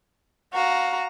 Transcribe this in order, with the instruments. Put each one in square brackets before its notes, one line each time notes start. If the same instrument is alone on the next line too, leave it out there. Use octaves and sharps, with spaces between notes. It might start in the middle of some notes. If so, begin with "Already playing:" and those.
[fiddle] F#4 [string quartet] F5 A#5